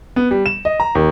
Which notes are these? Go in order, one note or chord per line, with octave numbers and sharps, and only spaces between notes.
B3
G3
E7
D#5
A#5
D#2